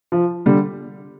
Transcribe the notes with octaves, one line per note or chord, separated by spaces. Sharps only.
F3
D3 G3